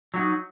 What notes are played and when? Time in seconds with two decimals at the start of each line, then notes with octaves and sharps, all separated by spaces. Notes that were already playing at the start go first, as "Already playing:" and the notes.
0.14 F#3
0.16 F#4
0.19 D#4